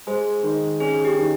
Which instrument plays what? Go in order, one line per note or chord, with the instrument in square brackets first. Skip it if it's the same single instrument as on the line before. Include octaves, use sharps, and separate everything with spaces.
[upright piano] G#3 [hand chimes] G#4 C5
[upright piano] D#3
[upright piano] C#4 [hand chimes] G#4
[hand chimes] G4
[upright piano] D#3